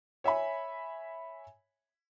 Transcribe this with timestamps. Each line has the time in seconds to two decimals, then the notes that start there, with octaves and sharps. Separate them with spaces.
0.24 C#5 E5 G#5 B5